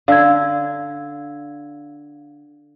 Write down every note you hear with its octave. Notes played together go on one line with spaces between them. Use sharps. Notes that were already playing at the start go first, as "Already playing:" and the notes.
D3 F5 E6 G#6